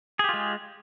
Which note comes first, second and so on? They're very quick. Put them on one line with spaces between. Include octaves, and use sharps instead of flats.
G#4 G4 F4 G#3